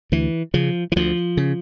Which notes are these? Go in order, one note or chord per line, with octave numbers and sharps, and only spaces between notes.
D2 E3
C#3 F3
E3
D2 F3
C#3